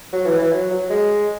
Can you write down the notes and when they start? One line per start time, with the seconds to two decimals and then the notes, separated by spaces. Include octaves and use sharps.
0.12 F#3
0.25 E3
0.38 E3
0.51 F#3
0.71 F#3
0.90 G#3